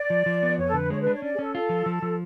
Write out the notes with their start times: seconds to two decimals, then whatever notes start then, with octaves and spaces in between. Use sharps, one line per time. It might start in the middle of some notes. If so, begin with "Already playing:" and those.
Already playing: D5
0.10 F3
0.26 F3
0.43 B3
0.58 F2 C#5
0.66 A4
0.74 D3 B4
0.90 G#3 C#5
1.01 B4
1.06 D4
1.14 C#5
1.22 C#4 D5
1.34 G#4
1.39 C#4 A4
1.55 F4 A4
1.69 F3
1.86 F3
2.02 F3